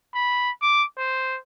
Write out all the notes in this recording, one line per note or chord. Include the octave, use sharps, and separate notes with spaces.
B5
D6
C5